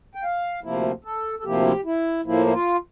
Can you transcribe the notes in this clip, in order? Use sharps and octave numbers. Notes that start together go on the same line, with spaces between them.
G5
F5
D2 C3 F3 A#3 E4
A4
A4
D2 C3 F3 A#3 E4 G4
E4
A2 F3 A#3 E4
E4
F4